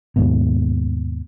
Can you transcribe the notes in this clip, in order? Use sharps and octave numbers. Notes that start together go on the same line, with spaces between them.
D#2 G#2 B2